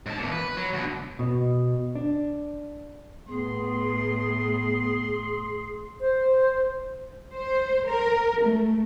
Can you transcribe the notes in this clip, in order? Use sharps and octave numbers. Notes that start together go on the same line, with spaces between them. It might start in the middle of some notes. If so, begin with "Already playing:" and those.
G#2 A5
E2 A#2
B4
F#3
D2 B2
B2
D4
A2 B3 G#4 C6
C5
C5
A#4
A3